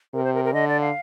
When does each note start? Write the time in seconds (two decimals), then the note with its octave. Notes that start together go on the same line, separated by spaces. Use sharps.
0.14 C3 A#4
0.24 C5
0.34 A#4
0.44 A#4
0.53 D3 D#5
0.68 D5
0.81 F5